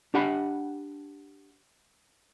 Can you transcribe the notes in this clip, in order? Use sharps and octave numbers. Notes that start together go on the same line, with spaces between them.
D4 G4 F#5 B5